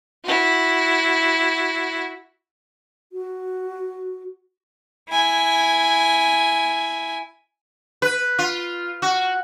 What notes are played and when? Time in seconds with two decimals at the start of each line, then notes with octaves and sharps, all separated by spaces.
0.25 E4 F#4
3.12 F#4
5.09 E4 G#5
8.02 B4
8.39 F4
9.02 F#4